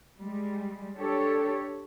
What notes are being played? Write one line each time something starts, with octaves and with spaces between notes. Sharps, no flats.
G3 G#3
D4 G4 A4 C#5